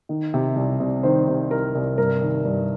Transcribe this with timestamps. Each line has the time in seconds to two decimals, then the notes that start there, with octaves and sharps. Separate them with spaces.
0.09 D#3
0.34 C3
0.56 C2
0.80 C2
1.03 D#3 C5
1.27 C3
1.51 C2 A#4
1.75 C2
1.98 G2 A#4
2.22 D#3
2.45 G2